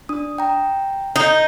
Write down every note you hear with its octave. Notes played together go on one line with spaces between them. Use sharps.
D4 D#6
G5 A#5
D#4 D#5 G6